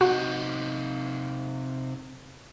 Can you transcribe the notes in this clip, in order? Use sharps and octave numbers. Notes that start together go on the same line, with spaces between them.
C3 D#4 F#4